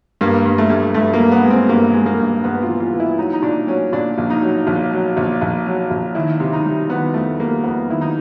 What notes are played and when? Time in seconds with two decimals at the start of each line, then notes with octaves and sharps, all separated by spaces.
0.21 G2 A#3
0.46 G2
0.58 A3
0.70 G2
0.94 G2 A3
1.13 A#3
1.20 G2
1.32 B3
1.45 G#3
1.50 C4
1.69 G2 A#3
1.94 G#3
2.06 A#3
2.19 G2
2.44 G2 B3
2.63 F4
2.68 E3
2.80 F4
2.93 E3
3.00 E4
3.18 F#3 D#4
3.33 D#4
3.42 A#2 D4
3.67 F#3 C#4
3.92 A#2 D4
4.18 A#1
4.30 D#4
4.42 F#3
4.67 A#1
4.92 F#3
5.17 A#1
5.41 A#1
5.66 F#3
5.90 A#1
6.15 D#3 E4
6.40 C3
6.53 D#4
6.65 G3
6.89 D#3 B3
7.14 F2 A3
7.39 G3 A#3
7.64 F2 B3
7.89 D#3 E4
8.01 D#4